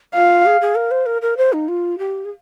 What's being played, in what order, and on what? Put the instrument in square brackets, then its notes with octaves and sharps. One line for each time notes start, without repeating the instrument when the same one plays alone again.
[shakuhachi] F4 [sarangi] F5
[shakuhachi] G#4
G#4
A#4
C5
A#4
A#4
C5
D#4
F4
G4
G#4